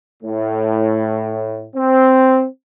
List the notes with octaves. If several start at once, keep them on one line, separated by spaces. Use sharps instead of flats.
A2
C4